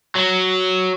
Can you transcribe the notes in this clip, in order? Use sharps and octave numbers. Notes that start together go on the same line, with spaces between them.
F#3